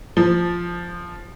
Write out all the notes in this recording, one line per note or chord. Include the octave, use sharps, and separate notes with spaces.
F3